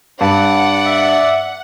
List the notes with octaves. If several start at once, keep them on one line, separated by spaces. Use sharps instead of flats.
G2 D5 F#5
E5